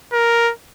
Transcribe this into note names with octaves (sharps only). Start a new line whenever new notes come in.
A#4